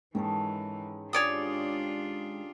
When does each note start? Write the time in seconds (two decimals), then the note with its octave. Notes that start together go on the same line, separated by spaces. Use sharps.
0.15 G#2 D#3 E3 C#4 A4
1.13 D4 F4 G4 G#4 C#5 D5 D#6